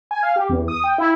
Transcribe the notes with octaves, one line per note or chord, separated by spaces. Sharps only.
G#5
F5
G4
E2
D#6
G5
E4